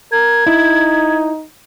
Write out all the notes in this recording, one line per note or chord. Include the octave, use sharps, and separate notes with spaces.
A#4 G#6
D#4 E4